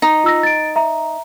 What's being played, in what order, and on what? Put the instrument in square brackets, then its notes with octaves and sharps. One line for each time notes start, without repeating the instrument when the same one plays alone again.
[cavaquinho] D#4
[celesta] F4 E6 A#6
A6 D7
E5 A#5